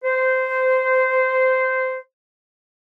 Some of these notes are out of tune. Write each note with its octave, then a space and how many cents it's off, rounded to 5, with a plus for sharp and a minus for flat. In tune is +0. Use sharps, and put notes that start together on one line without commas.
C5 -15